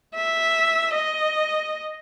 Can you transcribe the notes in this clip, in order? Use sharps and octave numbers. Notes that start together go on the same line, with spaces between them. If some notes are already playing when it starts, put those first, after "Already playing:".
E5
D#5